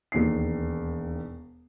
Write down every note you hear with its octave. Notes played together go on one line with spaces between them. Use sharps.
E1 D#2 C7